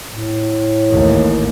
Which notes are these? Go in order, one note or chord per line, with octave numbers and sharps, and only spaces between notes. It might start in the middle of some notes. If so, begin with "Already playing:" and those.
A2
A1 D#2